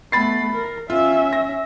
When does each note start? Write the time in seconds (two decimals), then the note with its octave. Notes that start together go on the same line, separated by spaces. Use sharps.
0.12 A3 B3 B5 A6 C7
0.53 A#4
0.90 C#4 F4 E5
1.33 A#6